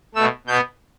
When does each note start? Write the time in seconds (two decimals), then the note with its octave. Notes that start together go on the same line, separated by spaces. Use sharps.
0.15 B2 A3 E6
0.47 B2 B3 G6